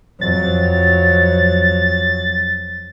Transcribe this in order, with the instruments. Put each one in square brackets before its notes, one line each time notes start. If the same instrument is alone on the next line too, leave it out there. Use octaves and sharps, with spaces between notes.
[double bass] F2 F#3 [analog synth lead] A6